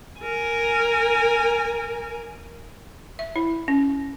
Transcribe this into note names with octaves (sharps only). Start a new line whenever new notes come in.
A#4 G#5
E5
E4
C#4